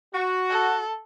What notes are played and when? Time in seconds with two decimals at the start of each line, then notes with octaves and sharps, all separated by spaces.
0.13 F#4
0.50 A4